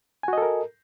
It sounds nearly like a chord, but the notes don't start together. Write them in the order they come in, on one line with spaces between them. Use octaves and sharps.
G#5 F#4 D#5 A4 A#4